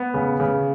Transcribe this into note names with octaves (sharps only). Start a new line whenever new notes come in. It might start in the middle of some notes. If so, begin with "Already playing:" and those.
Already playing: B3
C#3
C#3